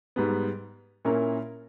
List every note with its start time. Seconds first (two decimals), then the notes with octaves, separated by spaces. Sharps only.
0.16 G#2 G3 B3
1.05 A#2 A#3 C#4 E4 A#4